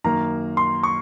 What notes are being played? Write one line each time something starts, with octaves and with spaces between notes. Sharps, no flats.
F#2 D#3 A#3 A#5
C6
C#6